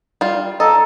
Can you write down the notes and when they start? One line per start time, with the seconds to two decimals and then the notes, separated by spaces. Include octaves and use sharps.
0.21 G3 F4
0.60 A4 D#5 A#5